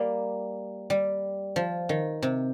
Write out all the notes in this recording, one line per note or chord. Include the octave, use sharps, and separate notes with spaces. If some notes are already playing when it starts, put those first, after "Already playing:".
Already playing: G3 A#3
G3
F3
D#3
C3